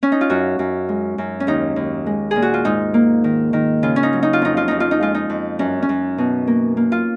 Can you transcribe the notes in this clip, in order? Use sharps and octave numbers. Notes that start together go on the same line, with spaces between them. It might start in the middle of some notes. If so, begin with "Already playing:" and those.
C#4
D#4
F4
F#2 F#4
F#2
G#3
F#2
C#4
D#2 D#4
D#2
G#3
A#2 G#4
F#4
F4
G#2 D#4
A#3
D#3
D#3
C#3 F4
C#4
D#4
F#3
D#4
F4
F2 D#4
F4
F2 D#4
F4
D#4
G#3 F4
D#4
F2
F#2 C#4
C#4
F#2
B2
A#3
A#3
F4